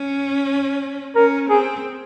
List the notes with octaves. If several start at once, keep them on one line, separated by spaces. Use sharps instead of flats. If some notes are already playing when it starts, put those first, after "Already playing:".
Already playing: C#4
C#4 A#4
C4 G#4